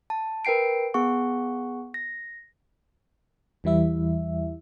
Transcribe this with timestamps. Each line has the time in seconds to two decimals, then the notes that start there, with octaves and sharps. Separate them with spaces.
0.10 A5
0.45 A#4 B4 G5 C7 D7
0.94 B3 G#4 F#5 C#6
1.94 A#6
3.64 E2 E3 G3 E4 E5